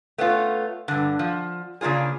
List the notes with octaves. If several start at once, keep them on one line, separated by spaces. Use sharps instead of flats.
A3 B3 C#4 F4
G2 D3
F3
C#3 A#3 D4 F4 G#4